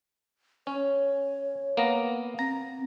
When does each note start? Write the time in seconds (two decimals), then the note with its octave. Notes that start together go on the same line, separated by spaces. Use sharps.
0.67 C#4 C#5
1.77 A#3 B3 A#5
2.39 C4 A#5